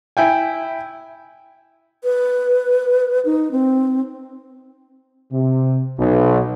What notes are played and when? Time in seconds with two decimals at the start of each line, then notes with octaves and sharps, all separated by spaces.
0.17 E4 G5 G#5
2.04 B4
3.25 D#4
3.52 C4
5.32 C3
5.98 B1